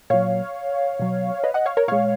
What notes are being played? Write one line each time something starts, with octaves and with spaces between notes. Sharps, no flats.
A#2 F#3 C#5 F5
B2 F#3
B4 D#5
D#5 F#5
C#5 F5
A#4 C#5
A#2 G#3 C#5 F5